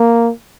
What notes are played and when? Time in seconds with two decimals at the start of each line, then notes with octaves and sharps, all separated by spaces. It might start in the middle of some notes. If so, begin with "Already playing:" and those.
Already playing: A#3